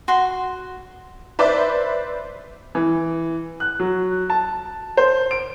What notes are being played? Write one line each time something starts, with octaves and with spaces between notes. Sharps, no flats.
F#4 C6
B4 C5 D5 E5
E3
F#6
F#3
A5
C5
D7